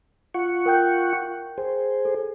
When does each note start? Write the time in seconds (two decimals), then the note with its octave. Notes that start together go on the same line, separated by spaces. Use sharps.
0.34 F4 F#5 C#6
0.66 A#4 G5 G6
1.58 G#4 C5
2.05 A4